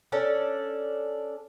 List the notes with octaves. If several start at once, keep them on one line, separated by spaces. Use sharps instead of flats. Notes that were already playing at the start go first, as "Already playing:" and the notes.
C#4 D4 A4